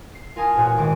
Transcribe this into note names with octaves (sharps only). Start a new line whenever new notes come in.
C7
F4 A#4 G#5 A5 D#6
A1 A#2 F#4 C#5
G#1 D#3 D6